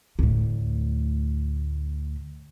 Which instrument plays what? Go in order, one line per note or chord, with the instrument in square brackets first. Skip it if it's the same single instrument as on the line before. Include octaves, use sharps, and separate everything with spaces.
[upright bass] D2 A2